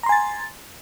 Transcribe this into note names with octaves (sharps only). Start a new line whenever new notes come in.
G#5 A#5 C6 A6